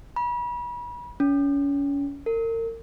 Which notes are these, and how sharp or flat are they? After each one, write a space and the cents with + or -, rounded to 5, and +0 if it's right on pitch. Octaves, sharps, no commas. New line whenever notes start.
B5 -35
C#4 +30
A#4 -35